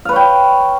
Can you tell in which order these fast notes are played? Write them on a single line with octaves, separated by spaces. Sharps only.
F5 B4 C#5 G5